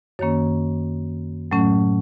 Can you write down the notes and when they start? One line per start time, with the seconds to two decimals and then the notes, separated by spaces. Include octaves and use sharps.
0.19 F#2 D#3 A#3 C#4 C#5
1.51 A2 F#3 A3 C#4